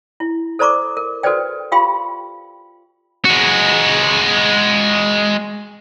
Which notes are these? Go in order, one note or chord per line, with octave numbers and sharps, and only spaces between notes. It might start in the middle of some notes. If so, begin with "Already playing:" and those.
E4
A4 C5 D5 A#5 C#6 D6
A#4
F#4 A4 B4 C5 D5 G5
F4 G4 F5 G5 B5 C6
G#3 F#4